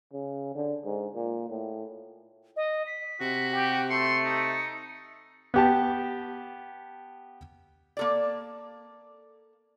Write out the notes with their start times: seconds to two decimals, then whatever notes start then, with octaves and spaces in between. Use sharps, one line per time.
0.13 C#3
0.55 D3
0.85 G#2
1.15 A#2
1.50 A2
2.56 D#5
2.87 B6
3.21 C3 F#4
3.53 G4
3.90 A3 C6 C#7
4.25 D#4
5.54 B3 G4 A5
7.97 A#3 A4 D5